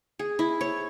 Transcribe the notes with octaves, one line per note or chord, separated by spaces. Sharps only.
G#4
E4
C#5